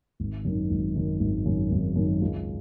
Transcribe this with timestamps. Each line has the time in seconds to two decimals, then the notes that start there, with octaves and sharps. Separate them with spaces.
0.20 G#1
0.45 F#2 D#3
0.70 G#1
0.95 F#2 D#3
1.20 G#1
1.46 F#2 D#3
1.71 G#1
1.96 F#2 D#3
2.21 C#2